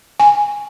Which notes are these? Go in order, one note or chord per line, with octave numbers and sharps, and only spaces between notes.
G#5